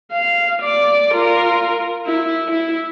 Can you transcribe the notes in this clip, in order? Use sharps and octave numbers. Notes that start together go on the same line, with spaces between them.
F5
D5 D6
F4 A#4
E4
E4